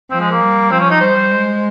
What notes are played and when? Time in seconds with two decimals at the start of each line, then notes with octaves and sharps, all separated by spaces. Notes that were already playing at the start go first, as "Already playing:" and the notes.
0.11 F3 C4
0.20 G#3
0.31 A#3
0.40 G3
0.71 F3 C4
0.80 C#4
0.90 D#4
1.00 G3 C5
1.31 G#3